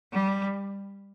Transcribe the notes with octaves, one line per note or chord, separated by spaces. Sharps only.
G3